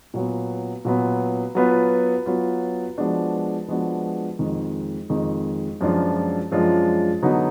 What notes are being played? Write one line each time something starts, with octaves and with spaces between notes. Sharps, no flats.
A#2 F#3 B3
A#2 F#3 B3
F#3 B3 F4 B4
F#3 B3 F4 B4
F3 G#3 B3 D4 F#4
F3 G#3 B3 D4 F#4
F2 D#3 G#3
F2 D#3 G#3
F#2 F3 G#3 D4 F4
F#2 F3 G#3 D4 F4
D3 F#3 B3 D#4